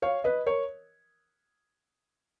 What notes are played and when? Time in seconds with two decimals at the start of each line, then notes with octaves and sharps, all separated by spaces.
0.02 C#5 F5
0.24 B4 D#5
0.47 A#4 C#5